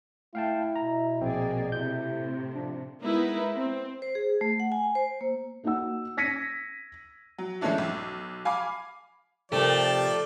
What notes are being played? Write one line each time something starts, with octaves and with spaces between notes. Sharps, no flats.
A3 E4 F5 G5 A5
B2 A#5
A#1 A#3 C4 G#4 D5
A2 C3 E4 G6
F3 D4
G#3 B3 D#4 E4 A#4 B4
C4
C5
G#4
A3
F#5
G#5
C5
A#3
A#3 D#4 F#4 F#5 E6
G#6 A#6 B6 C#7 D#7
F#3
E3 G#3 A3 C#4 D4 E4
B1
F5 G#5 B5 D6
C3 F3 A3 G4 A#4 D5